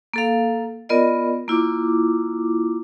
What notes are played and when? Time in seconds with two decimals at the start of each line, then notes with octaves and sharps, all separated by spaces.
0.14 A#3 A4 F5
0.89 B3 F4 A#4 D5 D#5
1.48 A#3 E4 F4 D6